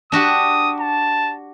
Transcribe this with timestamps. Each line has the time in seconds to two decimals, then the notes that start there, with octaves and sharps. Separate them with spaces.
0.12 D4 F#4 G4 D#6
0.80 A5